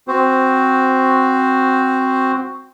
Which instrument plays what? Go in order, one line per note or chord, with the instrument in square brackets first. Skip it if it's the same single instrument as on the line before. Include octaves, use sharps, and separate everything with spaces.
[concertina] C4 F#4 C5